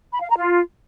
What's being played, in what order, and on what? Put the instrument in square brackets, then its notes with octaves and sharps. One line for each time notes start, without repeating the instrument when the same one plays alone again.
[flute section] B5
F5
A#5
F4